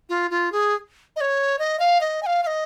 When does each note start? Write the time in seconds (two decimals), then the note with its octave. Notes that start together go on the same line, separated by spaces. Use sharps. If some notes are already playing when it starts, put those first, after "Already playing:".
0.09 F4
0.31 F4
0.52 G#4
1.16 D#5
1.21 C#5
1.59 D#5
1.79 F5
2.01 D#5
2.23 G#5
2.26 F5
2.43 F5
2.47 D#5